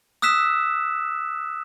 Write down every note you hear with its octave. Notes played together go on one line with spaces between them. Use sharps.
D#6 E6 F#6 B6 E7